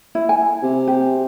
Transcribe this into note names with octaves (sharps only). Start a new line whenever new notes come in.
E4
G#5
C3
G4